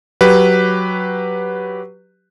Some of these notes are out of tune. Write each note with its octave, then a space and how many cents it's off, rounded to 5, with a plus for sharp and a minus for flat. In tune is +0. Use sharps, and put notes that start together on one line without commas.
F#3 +0 G4 +0 B4 +0